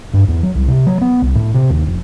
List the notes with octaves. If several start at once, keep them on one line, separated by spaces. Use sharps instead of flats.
G2
E2
F#3
C2
C3
F#3
B3
C2
A2
C3
D#2
F1